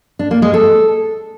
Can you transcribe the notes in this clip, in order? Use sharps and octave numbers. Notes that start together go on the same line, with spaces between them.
D4
A#3
G#3
A4